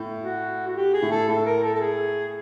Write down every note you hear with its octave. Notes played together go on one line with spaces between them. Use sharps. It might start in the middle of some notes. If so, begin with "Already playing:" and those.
Already playing: A2
F#4
F#4
G4
G#4
A2
A4
A2 A4
A#4
A4
A4
G#4